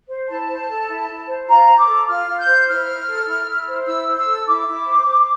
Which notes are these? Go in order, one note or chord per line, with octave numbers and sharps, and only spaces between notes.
C5
E4 A5
C5
A4
E4
E4
C5
F4 A#5
C5
D6
A4
F4 F6
F4
G6
C5
E4 F6
C5
A4
E4
E4
C5
E4 E6
C5
E6
A4
E4 D6
E4
C5
C5